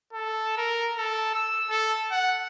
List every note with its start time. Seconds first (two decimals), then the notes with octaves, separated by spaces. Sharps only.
0.13 A4
0.57 A#4
0.98 A4
1.34 E6
1.69 A4
2.11 F#5